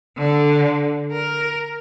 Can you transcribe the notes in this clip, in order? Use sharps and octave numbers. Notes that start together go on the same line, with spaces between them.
D3
A#4